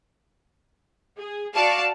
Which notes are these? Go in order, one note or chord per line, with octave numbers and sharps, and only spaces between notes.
G#4
F#4 D5 F5 A5